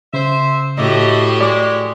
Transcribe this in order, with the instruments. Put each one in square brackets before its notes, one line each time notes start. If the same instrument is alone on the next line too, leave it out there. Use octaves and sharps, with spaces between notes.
[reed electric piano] C#3 [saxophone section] C5 E5
[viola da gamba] A2 F#4 G4 [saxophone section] A3 D5 D#5
[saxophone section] G#3 [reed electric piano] D5 D6